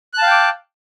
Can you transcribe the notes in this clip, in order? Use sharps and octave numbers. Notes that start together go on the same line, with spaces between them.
F5 G5 A5 D6 F#6